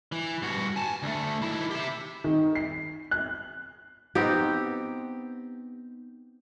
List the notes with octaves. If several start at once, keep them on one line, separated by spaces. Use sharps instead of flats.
E3
G2 F#4
G#5 A5
D2 A3
D#3 E4
G4 E5
D#3
C7
F#6
B3 C4 D#4 G4